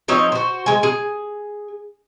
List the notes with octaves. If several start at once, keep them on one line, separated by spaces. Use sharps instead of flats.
F3 C4 D#4 C#5
F#4 C5
G#3 G#5
G#4